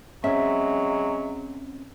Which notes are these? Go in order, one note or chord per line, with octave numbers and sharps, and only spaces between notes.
F#3 G#3 C4 C#4 E5